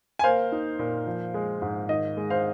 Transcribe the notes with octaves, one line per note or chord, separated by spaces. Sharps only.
G#5
A#3 C5 F5
D#4
A#2
F3
G#3
G#2
D#3 D#5
G#3
C5 F5